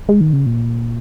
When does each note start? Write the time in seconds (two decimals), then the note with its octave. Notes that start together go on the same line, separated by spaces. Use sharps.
0.09 G#3
0.21 D#3
0.33 C#3
0.46 A#2